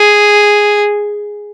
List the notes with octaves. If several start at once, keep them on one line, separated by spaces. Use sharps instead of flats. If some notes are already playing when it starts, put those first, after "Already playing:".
Already playing: G#4